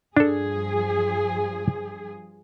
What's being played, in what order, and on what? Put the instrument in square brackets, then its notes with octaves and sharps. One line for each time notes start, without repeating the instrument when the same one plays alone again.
[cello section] G2 F3 G#4 [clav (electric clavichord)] D4 A4